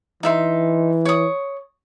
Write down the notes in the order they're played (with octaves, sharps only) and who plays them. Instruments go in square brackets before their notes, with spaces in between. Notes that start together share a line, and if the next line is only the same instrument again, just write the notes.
[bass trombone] E3 [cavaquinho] D#4 E5 C6
[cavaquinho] C#5 D#6